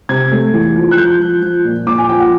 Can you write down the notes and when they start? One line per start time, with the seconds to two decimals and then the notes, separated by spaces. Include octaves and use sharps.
0.09 C3 G#6
0.31 A3
0.53 E2
0.76 F3
0.91 F#6
0.98 F3 G6
1.20 F3
1.42 F3
1.65 A#2
1.87 A#2 D6
1.98 G#5
2.09 F3 G5
2.20 F#5